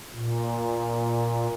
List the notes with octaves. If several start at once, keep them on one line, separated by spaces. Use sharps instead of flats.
A#2